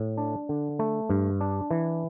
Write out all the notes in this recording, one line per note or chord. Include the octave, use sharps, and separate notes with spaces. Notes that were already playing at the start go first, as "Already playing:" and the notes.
Already playing: A2
D4
D3
A3
G2
D4
E3